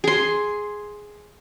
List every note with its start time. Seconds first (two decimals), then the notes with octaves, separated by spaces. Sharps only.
0.04 G#4 C6